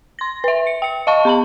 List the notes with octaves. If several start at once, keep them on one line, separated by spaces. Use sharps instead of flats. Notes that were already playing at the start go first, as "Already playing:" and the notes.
C6 A#6
B4 E5
C#7
G5 C#7
D#5 F5 A5 C#6
B3 B5 F#7